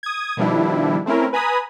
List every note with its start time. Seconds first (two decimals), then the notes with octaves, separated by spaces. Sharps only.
0.03 D#6 G#6
0.37 B2 D#3 F3 G3 D4 E4
1.06 A3 C4 C#4 E4 A#4
1.33 B4 G#5 A#5 B5 D#6